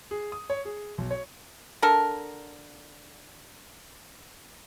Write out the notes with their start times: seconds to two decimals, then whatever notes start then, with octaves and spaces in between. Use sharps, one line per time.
0.11 G#4
0.32 D#6
0.50 C#5
0.65 G#4
0.98 B1
1.11 C#5
1.82 D3 A4 A#4